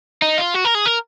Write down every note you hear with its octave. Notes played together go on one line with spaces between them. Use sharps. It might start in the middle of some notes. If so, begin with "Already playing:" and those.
D#4
F4
F#4
A#4
G#4
A#4